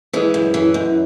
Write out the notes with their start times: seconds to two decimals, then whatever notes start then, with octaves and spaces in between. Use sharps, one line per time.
0.13 E3 G#3
0.34 F#2
0.54 E3
0.74 F#2